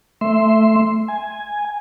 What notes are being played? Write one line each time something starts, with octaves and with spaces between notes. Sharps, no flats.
A3 E5 C6
G#5